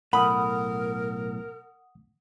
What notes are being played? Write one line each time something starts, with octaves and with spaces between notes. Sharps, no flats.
B1 A2 A#4 F#5 B5 D#6